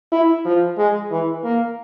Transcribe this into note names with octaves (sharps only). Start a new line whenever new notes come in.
E4
F3
G#3
E3
A#3